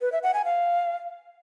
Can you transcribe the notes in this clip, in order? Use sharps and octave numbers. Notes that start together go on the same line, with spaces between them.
B4
E5
F#5
G#5
F5